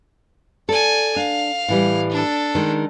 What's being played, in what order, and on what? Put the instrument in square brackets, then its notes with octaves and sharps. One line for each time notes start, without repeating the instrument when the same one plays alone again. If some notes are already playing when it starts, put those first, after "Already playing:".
[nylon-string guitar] A4 [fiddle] D5 G#5
[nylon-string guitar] D4 [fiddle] F5
[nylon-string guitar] A2 E3 G3
[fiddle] D4 A4
[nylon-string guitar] D#3 G#3